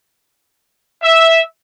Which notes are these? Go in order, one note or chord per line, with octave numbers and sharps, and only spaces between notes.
E5